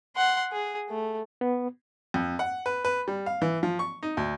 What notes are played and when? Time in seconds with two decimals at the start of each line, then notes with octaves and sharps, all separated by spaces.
0.17 F#5 C6
0.52 G#4
0.90 A3
1.41 B3
2.14 F2
2.39 F#5
2.66 B4
2.85 B4
3.08 G3
3.26 F5
3.42 E3
3.63 F3
3.79 C#6
4.03 D#4
4.17 D2